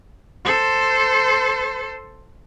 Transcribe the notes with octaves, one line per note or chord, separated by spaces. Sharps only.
A4 C5